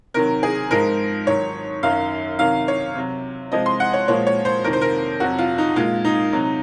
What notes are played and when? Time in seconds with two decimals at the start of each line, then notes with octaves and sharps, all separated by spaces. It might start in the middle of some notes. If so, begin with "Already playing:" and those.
0.14 C3 D#3 F#3 A#4
0.43 G#4
0.71 G#2 F3 G#3 A#4
1.27 G#2 D#3 F#3 C#5
1.83 F#2 D#3 F#3 F5
2.39 C3 D#3 F#3 F5
2.68 C#5
2.95 C3 F#3
3.52 C3 F3 G#3 D#5
3.66 C6
3.80 F#5
3.93 C#5
4.08 A#2 F3 G#3 C#5
4.27 C#5
4.45 C5
4.64 F2 C3 D#3 A#4
4.73 C5
4.81 A#4
5.20 F2 C3 F#3 F#4
5.38 F4
5.58 D#4
5.76 A#2 G#3 F4
6.05 D#4
6.33 C3 F#3